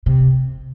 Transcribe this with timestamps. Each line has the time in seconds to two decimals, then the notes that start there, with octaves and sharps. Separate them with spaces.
0.06 C3